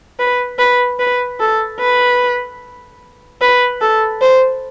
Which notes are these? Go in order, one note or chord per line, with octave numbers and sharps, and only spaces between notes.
B4
B4
B4
A4
B4
B4
A4
C5